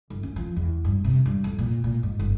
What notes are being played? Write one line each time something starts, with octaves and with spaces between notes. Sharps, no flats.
G1
C#4
F3
E2
G2
C3
G2
F2
A#2
A#2
G#2
G1